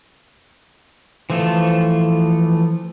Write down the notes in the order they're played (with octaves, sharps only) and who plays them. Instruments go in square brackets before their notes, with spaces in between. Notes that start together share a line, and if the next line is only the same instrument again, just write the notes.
[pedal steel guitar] E3 F3 A3 F4 A4